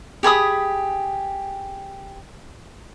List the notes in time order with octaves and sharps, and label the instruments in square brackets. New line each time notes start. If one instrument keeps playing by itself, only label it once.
[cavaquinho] G4 G#4 B5 D#6